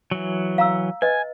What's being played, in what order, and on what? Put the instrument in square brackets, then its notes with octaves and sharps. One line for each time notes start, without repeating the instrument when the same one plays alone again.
[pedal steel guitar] E3 F#3
[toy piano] F5 A#5 E6
[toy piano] B4 D#5 [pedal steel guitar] G#5